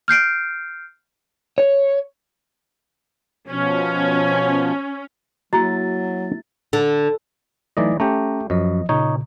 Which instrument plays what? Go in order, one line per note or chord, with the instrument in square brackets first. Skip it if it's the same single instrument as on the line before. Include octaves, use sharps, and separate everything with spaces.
[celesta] F6 G6 C7 D7
[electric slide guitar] C#5
[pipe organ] B2 F3 [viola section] C#4
[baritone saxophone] F#3 [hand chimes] A#3 E4 A6 [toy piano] F#4 G#4 [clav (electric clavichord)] A#5
[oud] D3
[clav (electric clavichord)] E3 D5 D#5 [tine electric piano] F#3 A3 D#4
[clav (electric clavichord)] A3 G4 [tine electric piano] C#4 A#5
[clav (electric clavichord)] F#2 [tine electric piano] F3 D#5
[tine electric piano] A#2 C#3 [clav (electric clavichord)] D#4 C#5